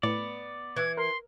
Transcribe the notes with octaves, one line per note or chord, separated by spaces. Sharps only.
A2 B3 D5
E3 E5 F#6 G#6
A#4 C6